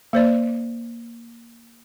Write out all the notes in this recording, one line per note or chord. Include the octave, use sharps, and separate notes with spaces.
A#3 C5 D5